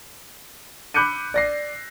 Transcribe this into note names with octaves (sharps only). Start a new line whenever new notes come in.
B5 D6 F#6 G6 C#7 D#7
D5 A#6 C7